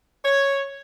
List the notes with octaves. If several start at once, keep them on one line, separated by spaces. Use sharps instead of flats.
C#5